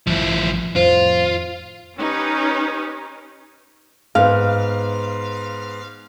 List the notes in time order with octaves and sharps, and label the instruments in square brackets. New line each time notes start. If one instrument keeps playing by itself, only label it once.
[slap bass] A1 G2 [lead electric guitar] F3 E4
[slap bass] F2 A2 D#3 [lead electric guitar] F4 [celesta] C5
[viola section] C#4 D#4 G4 B4
[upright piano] G#2 B3 [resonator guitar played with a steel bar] F5